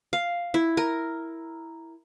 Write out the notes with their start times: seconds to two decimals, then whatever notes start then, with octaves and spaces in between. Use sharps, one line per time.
0.13 F5
0.54 E4
0.77 A#4